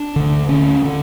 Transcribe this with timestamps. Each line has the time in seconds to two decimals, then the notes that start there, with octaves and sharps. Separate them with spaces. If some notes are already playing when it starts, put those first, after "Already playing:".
Already playing: D4
0.16 D2 D3
0.49 D2 D3 C#4
0.85 D3